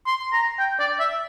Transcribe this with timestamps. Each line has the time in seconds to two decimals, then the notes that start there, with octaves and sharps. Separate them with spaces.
0.06 C6
0.33 A#5
0.59 G5
0.79 D5
0.99 E5